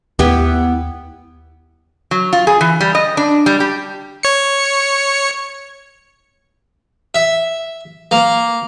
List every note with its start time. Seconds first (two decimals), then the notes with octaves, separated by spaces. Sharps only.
0.19 D#2 B3 E4 G4
2.11 F#3
2.33 F4
2.47 G#4
2.61 E3
2.81 G3
2.95 D#5
3.17 D4
3.46 G3
3.60 G4
4.23 C#5 C#7
7.15 E5
8.11 A#3